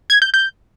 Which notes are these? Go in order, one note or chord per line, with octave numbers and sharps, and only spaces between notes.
G#6
G6
G6